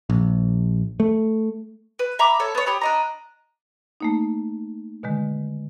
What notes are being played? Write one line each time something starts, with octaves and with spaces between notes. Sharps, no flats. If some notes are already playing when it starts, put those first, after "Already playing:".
A#1
A3
B4
E5 A#5 B5 D6
A4 C#5
B3 C#5
G4 C#5 B5 D#6
D4 D#5 A#5
A3 A#3 D#4
B2 D3 D#3 G#3